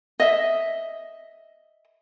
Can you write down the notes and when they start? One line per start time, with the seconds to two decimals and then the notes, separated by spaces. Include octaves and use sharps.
0.20 D#5 E5